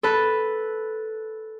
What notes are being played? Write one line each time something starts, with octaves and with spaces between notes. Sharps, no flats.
A4 B4